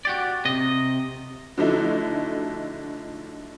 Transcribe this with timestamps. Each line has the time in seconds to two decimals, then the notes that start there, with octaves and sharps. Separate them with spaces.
0.05 F#4 G4 D5
0.45 C3 D#5
1.58 D3 F3 F#3 A3 D#4 E4